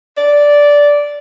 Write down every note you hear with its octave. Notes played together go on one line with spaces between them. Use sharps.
D5